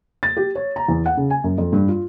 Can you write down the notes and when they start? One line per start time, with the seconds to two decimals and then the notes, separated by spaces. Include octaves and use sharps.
0.23 A6
0.37 G4
0.55 C#5
0.76 A#5
0.88 E2
1.06 F#5
1.17 C#3
1.30 G#5
1.44 F#2
1.58 F2
1.72 G2
1.88 F4